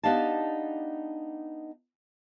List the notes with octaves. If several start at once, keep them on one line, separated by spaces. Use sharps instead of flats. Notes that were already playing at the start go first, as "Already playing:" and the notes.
B3 D4 D#4 G4 F5 A5